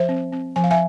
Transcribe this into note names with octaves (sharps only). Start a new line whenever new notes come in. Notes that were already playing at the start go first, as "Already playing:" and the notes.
Already playing: F3 C5 E5
C4
C4
F3 G#5
F5
E5 G#5